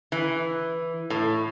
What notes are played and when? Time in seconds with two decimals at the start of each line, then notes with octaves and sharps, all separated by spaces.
0.12 E3
1.10 A2